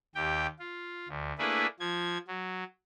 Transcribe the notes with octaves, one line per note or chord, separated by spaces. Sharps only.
D#2 G4 G5
F4
D2
A3 A#3 D4 E4 G#4 B4
F3 G#6
F#3